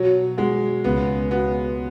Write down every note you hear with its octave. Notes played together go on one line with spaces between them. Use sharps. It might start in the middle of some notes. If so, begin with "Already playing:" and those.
Already playing: B2 F#3
G#3 F#4
C#2 B3
B3 F#4